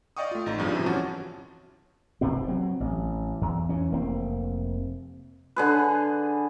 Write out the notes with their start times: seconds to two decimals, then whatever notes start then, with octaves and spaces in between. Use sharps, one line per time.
0.17 D5 D#5 F5 G5 C#6 D#6
0.31 A3 F4
0.46 A1 D#4
0.58 E2 G2 C#3 F3 G3
0.73 C3 E3 F3 E4
0.86 G1 C#4 F#4 A5
2.21 F1 C3 B3 C4
2.47 F#3 C4
2.80 A1
3.41 E2
3.69 E3 C#4
3.91 F1 A#3 C4
5.56 D3 G#4 B4